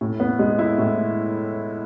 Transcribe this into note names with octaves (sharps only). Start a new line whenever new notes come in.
A2
B3
G#3
E4
A2